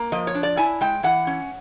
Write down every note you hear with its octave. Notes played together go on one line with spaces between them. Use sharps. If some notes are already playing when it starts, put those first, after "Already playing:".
Already playing: A#3
F3 D#5
C#5
D4
D5
E4 G#5
G#3 G5
E3 F#5
C#4